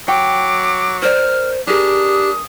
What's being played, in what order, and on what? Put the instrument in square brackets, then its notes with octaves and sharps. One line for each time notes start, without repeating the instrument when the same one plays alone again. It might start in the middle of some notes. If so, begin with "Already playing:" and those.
[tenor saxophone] F#3 [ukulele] G5 [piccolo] D6
[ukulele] A#4 D5 [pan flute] C5 [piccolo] F6
[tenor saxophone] D4 [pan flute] G4 [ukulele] G#4 A#4 [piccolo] D#6